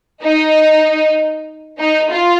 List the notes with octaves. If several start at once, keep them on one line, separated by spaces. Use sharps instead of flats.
D#4
D#4
F4